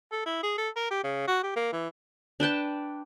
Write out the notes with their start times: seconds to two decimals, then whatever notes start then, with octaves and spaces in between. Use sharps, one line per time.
0.12 A4
0.26 E4
0.43 G#4
0.58 A4
0.76 A#4
0.91 G4
1.04 C#3
1.28 F#4
1.43 G4
1.56 A#3
1.73 E3
2.40 D4 B4 G5 A5